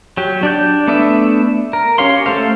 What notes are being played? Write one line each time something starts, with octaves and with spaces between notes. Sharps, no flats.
F#3 G4
D4 D5 G6
A3 B3 D4 E5
A#4
C#4 G4 C#5 F5 C6
A3 A4 C5 F5